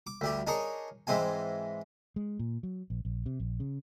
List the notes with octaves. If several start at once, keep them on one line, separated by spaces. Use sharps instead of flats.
D6
D2 G3 G4
D4 D#4 G#4 A#4 C#5
G#2 E3 G#3 C4 G#5
G#3
A#2
F#3
A#1
A#1
C3
A#1
C#3